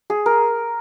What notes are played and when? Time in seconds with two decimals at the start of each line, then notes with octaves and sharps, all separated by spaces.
0.10 G#4
0.26 A#4